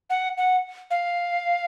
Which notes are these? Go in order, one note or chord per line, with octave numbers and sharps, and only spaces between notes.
F#5
F#5
F5